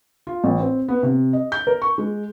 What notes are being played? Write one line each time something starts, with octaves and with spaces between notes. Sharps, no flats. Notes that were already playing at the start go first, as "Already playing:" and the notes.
F4
A1
C4
B3
C3
D#5
G6
A#4
C#6
G#3